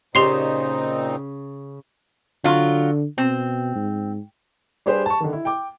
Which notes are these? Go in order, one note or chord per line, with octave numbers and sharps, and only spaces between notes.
A#2 C#3 C4 D#4 G4 C6 C7
D3 F#3 F4
B2 C4
G#2
G3 D4 G4 G#4 B4 C5
A5 C#6
D3 D#3
E4
G5 D6